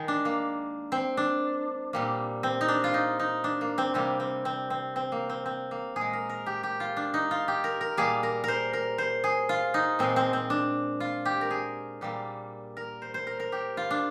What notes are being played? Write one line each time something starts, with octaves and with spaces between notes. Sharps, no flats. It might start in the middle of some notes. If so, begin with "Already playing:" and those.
Already playing: D#3 G#3
D4
A#3
C4
D4
A#2 G3 A#3
C4
D#4
D4
F4
D#4
D#4
D4
A#3
C4
C3 G3 A#3 C4
C4
C4
C4
C4
A#3
C4
C4
A#3
A#2 G#4
G#3
A#4
A#4
G4
G4
F4
D4
D#4
F4
G4
A#4
A#4
A#2 G3 A#3 G#4
A#4
A#4 C5
A#4
C5
G#4
F4
D#4
A#2 G#3 C4
C4
C4
D4
F4
G4
A#4
G#4
A#2 G3 A#3
A#4
C5
C5
A#4
A#4
G4
F4
D4